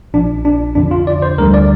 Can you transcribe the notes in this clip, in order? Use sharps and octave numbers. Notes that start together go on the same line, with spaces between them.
A#1 A#2 F3 D4
D4
F2 D3 F3 D4
F4
D5
C5
D2 D3 G3 A#4
D5